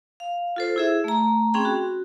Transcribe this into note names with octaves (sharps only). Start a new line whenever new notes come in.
F5
F4 A4 C5
E4 G#4 E5
A3 A#5
C4 C#4 G#4 G5 B5
F#4